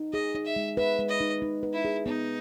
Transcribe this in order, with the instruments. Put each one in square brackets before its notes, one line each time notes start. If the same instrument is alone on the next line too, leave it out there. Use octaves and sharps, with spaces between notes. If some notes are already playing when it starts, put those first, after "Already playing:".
Already playing: [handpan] D#4
[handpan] G#4 [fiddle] D#5
[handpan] D#4
[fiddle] E5
[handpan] G#3
[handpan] B4 [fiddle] E5
[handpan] G#3
[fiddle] D#5
[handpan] D#4
D#4
B4
[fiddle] E4
[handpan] G#4
[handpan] B3 [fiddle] D#4